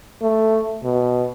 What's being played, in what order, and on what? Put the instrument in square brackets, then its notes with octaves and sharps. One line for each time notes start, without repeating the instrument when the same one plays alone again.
[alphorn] A3
B2